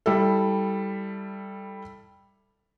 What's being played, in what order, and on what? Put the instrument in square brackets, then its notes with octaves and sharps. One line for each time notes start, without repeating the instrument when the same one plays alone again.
[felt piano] G3 E4 A4